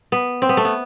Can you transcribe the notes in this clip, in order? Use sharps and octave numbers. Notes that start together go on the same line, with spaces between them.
B3
C4
B3
A3
B3